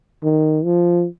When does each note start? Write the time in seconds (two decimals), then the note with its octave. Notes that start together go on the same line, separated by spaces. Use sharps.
0.24 D#3
0.64 F3